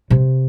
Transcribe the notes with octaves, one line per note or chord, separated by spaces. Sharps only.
C3